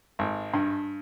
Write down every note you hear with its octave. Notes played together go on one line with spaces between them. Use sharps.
G#1
G2